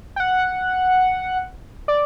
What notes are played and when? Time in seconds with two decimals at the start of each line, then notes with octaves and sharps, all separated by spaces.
0.16 G5
0.20 F#5
1.88 D5